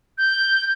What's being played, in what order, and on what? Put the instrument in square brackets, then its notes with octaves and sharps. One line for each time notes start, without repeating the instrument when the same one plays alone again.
[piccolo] G6